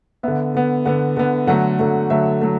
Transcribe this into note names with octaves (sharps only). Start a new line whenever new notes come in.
D3 B3 E5
D3 B3
D3 B3 F#5
D3 B3
D3 F#3 A3 F#5
D3 F#3 A3
D3 F#3 A3 E5
F#3 A3